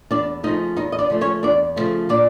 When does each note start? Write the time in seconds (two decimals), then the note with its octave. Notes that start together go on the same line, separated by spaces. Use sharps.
0.11 E2 D4 D5
0.43 C#3 F3 A3 D#4 D#5
0.77 E2 D#4 D#5
0.92 D#5
0.99 D4 D5
1.10 C#3 F3 A3
1.21 C#4 C#5
1.43 E2 D4 D5
1.76 C#3 F3 A3
2.09 A#2 D4 D5